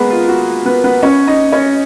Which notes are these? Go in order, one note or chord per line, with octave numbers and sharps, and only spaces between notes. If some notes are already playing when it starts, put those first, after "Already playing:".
Already playing: G#3 A#3 B3 G#4 A#4 B4
F4
F#4
B3 B4
B3 B4
C#4 C#5
D#4 D#5
C#4 C#5